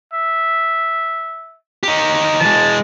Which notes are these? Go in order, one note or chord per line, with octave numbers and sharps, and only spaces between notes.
E5
D#4 G4
E3 G#3 A5